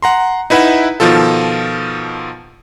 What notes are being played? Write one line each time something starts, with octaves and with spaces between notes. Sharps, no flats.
F#5 A#5 C6
D#4 E4 B4 E5 F#5
B2 D#3 F3 F4 A4